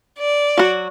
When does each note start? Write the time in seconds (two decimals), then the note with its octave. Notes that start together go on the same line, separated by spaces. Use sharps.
0.18 D5
0.58 F#3 F#4